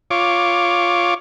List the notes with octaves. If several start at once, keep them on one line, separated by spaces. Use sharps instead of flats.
F4 C#5 D6